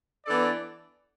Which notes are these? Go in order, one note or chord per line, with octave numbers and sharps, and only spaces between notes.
E3 B3 D4 A4 D5